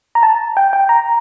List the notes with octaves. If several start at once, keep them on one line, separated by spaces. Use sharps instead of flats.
A#5
A5
G5
G5
A#5